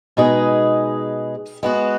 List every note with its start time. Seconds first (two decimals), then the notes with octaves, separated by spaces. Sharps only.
0.17 B2 G#3 D#4 G#4 B4
1.63 G#3 B3 F#4